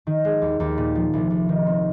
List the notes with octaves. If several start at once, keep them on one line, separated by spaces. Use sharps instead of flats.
D#3
G#3
D#2
D#2
A#2
F3
C2
C2
D#3
C4